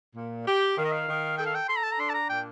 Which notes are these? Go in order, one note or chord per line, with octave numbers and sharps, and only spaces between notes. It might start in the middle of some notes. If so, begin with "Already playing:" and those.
A#2
G4
D#3 F5
D#5
F5
D#3
A4 G5
F5
G5
A4 C6
A#5
A5
A#5
D4 C6
A5
A#5
A#2 G5